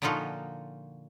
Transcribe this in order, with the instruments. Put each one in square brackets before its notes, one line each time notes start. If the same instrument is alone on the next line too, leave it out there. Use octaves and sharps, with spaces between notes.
[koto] A#2 D3 F3 D#4 F4 F#4